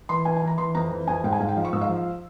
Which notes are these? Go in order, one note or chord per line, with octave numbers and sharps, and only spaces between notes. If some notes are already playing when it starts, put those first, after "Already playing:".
E3 C6
E3 G#5
G#5
E3 A#5
E3 C6
F2 A#5
E3
F2 G#5
G#2 G5
G#5
G#2 F5
G5
F3 F5
C#6
G#2 E6
F5
F3